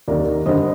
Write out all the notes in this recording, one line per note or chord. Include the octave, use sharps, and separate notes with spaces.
D#2 D#3 A#4 D5
G2 D3 C5 D#5